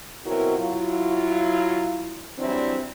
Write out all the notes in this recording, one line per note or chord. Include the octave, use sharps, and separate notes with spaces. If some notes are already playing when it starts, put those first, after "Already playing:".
B2 F#3 C4 E4 F#4 A#4
F#3 E4 F4
E3 F#3 G3 C4 D4 E4